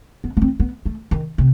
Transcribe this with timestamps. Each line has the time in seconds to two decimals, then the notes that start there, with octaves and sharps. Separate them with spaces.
0.24 B3
0.37 B3
0.42 C4
0.60 B3
0.86 A3
1.11 D#3
1.38 C3